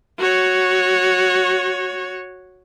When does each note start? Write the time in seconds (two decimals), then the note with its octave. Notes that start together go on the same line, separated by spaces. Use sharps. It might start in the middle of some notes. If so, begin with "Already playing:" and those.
0.19 F#4 C#5